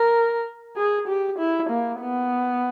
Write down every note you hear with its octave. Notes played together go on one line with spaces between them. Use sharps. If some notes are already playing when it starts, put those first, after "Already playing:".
Already playing: A#4
G#4
G4
E4
A#3
B3